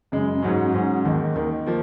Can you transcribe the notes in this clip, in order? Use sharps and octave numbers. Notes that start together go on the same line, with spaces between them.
F#2 C#3 G#3
G#2 F#3 C#4
G#2 F#3 C#4
D#2 D#3 A#3 D#4
D#2 D#3 A#3 D#4
F3 A#3